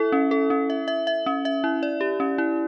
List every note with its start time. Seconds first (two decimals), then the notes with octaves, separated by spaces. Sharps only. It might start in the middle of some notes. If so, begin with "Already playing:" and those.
Already playing: E4 A4 E5
0.12 C#4
0.31 A4
0.50 C#4
0.70 E5
0.88 E5
1.07 E5
1.26 C#4
1.45 E5
1.64 E4
1.83 D5
2.01 G4
2.20 C#4
2.38 E4